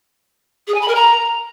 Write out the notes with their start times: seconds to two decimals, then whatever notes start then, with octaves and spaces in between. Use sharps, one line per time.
0.67 G#4
0.74 G#5
0.81 B5
0.88 A#4
0.95 A#5